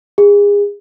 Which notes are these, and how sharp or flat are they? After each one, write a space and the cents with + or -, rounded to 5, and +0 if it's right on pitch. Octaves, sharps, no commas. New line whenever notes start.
G#4 -30